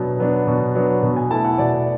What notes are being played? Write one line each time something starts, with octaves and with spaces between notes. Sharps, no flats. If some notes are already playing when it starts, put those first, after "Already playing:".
Already playing: B2 F#3 B3 D4
F#3 B3 D4
B2
F#3 B3 D4
B2
G#5
A3 E4 A5
F#5
B2 D5